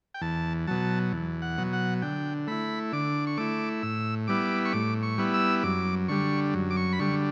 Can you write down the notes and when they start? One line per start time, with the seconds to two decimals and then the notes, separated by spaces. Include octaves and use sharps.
0.14 G5
0.21 E2 A5
0.67 B2 F#3 A5
1.12 E2
1.42 F#5
1.58 B2 F#3
1.73 F#5
2.02 D3 G5
2.47 A3 E4 B5
2.92 D3 D6
3.27 C#6
3.37 A3 E4 D6
3.83 A2 E6
4.27 G3 B3 E4 D6
4.65 C#6
4.73 A2 D6
5.03 C#6
5.18 G3 B3 E4
5.34 E6
5.63 F#2 D6
6.09 D3 G3 C#6
6.54 F#2
6.70 D6
6.77 C#6
6.93 B5
6.99 D3 G3 C#6